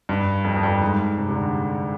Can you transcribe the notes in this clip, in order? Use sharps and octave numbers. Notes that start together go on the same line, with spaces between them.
G2
F2
F2
G2
G#2
C3
C3
D3